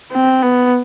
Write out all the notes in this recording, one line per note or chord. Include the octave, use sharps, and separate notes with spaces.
C4
B3